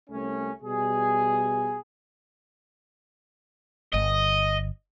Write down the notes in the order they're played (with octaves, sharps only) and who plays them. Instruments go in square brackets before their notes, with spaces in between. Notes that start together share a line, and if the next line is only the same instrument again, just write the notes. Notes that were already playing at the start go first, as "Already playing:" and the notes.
[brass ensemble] C2 A3 C#4
B2 G3 G#4
[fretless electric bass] G1 [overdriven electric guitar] D#5